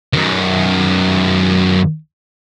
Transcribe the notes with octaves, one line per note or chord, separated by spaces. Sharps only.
F#2 D#3